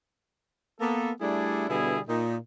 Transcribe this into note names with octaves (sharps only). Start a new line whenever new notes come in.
A#3 B3 A4
G3 A3 D4 E4 G#4 A4
B2 D3 G3 B3 E4 G#4
A#2 D#4